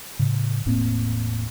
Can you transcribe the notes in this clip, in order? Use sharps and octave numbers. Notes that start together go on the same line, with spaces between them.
A2 C#3
E1 A2 A#3 C4